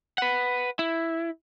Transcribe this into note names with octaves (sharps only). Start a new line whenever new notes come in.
B4 F#5
E4